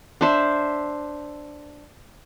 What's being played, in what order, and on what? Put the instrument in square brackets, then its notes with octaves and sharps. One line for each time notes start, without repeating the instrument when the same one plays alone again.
[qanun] D4 C5 E5